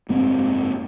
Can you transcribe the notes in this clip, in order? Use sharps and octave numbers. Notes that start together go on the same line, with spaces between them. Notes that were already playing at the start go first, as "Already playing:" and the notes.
F#1 G#2 A#3 C4